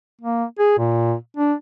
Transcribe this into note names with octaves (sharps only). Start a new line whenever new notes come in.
A#3
G#4
A#2
D4